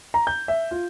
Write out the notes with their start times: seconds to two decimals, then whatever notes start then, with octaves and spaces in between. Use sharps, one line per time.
0.14 A#5
0.27 G6
0.48 E5
0.71 F4